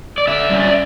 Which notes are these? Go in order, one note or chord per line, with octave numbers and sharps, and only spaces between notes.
D5
D3 E5
G3 C#4
D5